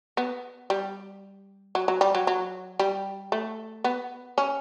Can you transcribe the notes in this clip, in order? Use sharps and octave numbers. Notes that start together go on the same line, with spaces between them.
B3
G3
F#3
F#3
G3
F#3
F#3
G3
A3
B3
C#4